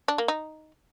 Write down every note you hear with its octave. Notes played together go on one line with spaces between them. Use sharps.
D4
A#3
D#4